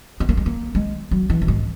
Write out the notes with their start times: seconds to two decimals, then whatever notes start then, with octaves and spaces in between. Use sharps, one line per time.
0.20 B3
0.29 A#3
0.37 G#3
0.46 A#3
0.75 G#3
1.11 F#3
1.30 E3
1.42 F#2
1.48 G#2